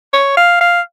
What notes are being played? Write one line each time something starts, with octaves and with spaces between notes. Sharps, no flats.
C#5
F5
F5